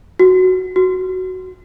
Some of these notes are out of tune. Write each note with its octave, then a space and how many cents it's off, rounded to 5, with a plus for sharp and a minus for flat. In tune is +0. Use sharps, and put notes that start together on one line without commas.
F#4 +0
F#4 +5